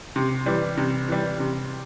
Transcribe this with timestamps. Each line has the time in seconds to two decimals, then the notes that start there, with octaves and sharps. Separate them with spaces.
0.16 C3
0.46 E3 G3
0.77 C3
1.08 E3 G3
1.40 C3